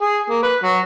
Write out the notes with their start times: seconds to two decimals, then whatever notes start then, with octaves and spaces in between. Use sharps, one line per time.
0.02 G#4
0.29 A#3
0.43 B4
0.63 F#3